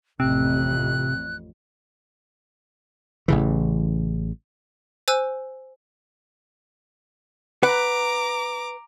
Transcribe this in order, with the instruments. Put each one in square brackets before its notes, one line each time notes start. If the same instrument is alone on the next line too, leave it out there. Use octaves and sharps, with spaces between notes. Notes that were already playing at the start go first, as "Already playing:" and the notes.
[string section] A1 F2 [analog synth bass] C3 [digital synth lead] C4 [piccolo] F#6
[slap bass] A1 C#3 E3
[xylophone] C5 G#5 E6 F#6
[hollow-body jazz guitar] B4 F#5 [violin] A#5 D6